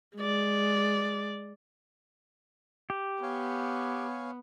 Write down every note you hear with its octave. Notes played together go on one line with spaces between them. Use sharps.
G#3 D5
G4
B3 C#5 F5 G#5